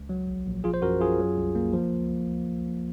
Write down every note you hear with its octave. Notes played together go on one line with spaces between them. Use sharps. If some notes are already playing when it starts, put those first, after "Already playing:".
Already playing: C#2
F#3
A#1
A#1
F3 F4 G#4
C5
F#2 F#4 A#4
F#2 F4 G#4
F#3
C2
A#3
F3
C#2